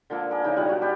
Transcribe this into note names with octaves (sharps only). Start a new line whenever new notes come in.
D3 F3 A#3 A4
A#3 G#4
C#3 E3 F3 D#4
B2 F3 G3 F#5
F#4 F#5 G5
G3 B3 G4